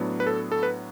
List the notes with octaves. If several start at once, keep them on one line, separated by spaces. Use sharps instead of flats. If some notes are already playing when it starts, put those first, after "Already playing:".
Already playing: A2 F#3 B3 D4
B4
A4
A4
B4